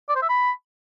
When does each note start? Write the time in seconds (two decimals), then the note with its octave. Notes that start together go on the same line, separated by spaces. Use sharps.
0.09 D5
0.16 C5
0.22 E5
0.29 B5